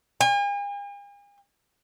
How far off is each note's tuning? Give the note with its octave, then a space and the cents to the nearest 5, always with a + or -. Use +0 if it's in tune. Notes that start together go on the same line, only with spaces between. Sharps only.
G#5 -45